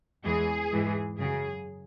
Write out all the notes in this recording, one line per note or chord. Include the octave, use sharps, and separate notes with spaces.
E2 E3 G#3 G#4
G#2 E3 G#3
F#2 C#3 F#3 G#4